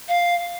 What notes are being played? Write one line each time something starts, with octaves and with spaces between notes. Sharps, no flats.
F5